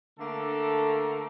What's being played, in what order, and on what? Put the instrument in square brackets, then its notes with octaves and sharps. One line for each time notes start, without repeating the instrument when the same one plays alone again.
[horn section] D3 A3 A#3 A4